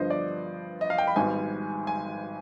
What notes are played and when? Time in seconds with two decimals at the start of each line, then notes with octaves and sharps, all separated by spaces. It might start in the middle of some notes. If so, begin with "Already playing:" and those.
Already playing: G2 D3 F3 B3 C5 D#5
0.10 D5
0.81 D#5
0.90 F5
0.98 G5
1.07 B5
1.16 G#1 G#2 G3 B3 G#5
1.87 G#5